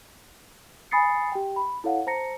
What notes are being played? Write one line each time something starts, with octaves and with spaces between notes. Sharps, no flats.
G#5 B5 D#6 A6 C7 C#7
G4 G5
B5
E4 A4 C#5 F5 F#5
C5 A5 A#5 A#6 C#7